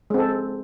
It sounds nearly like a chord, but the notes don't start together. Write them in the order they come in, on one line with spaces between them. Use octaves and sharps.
G#3 C4 A4